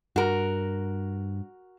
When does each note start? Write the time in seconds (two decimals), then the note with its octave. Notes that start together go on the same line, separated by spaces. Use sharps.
0.16 G2 F#4 A#4